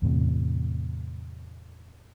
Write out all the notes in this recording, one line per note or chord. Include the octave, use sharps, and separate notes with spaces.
E2 A2 C3